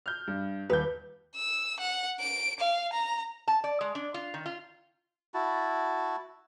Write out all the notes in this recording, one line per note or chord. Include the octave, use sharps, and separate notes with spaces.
F6 G6
G2
D#1 D#2 B4 G6
E6
F#5
D7
F5
A#5
A5
D5
G#3
D4
F4
D#3
F4
E4 F#4 A5